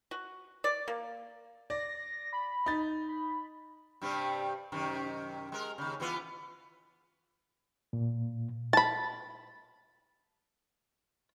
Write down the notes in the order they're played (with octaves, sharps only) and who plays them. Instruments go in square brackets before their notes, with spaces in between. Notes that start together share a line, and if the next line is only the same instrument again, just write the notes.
[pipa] F#4
D5
A#3
[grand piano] D5 [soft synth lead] A#6
[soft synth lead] B5
[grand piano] D#4 A6
[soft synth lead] B5
[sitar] G2 C3 G3
F#2 C3 D#3
G#3 A#4
D#2 C#3
E3 B3 F4
[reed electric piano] A#2
[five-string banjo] A5 B5